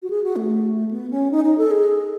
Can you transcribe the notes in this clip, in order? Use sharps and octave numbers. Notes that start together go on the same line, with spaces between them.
F#4
G#4
F#4
A3
B3
C#4
D#4
D#4
A4
G#4